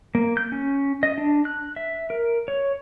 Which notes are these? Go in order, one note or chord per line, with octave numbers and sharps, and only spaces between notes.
A#3
G6
C#4
D#5
D4
F#6
E5
A#4
C#5